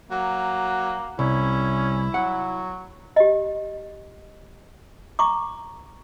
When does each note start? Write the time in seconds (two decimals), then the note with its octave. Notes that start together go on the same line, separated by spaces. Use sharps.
0.11 F#3 A#3
1.19 C2 C#4 E4
2.14 F#3 F#5
3.16 G4 D#5
5.19 A#5 C#6 D6